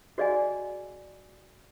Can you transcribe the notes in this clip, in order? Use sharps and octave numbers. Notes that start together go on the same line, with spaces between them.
F#4 G#4 D5 D#5 F5 G#5